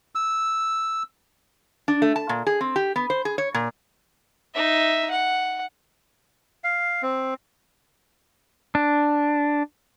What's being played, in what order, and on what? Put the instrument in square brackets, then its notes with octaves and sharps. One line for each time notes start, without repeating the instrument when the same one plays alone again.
[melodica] E6
[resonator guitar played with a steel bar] D4
A3
A5
A#2
G#4
C4
G4
B3
C5
G#4
C#5
A#2
[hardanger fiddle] D#4 E5
F#5
[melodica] F5
C4
[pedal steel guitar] D4